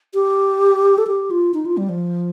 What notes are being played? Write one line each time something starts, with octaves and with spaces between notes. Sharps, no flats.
G4
A4
G4
F4
D#4
F4
G3
F3